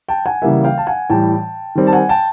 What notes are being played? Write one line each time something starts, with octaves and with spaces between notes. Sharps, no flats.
G5 A5
F#5 G#5
C#3 E3 G3 A#3 E5 F#5
F5 G5
A5
F#5 G#5
A2 E3 G3 G5 A5
D#3 G3 C4
A5
F#5 G#5
G5 A5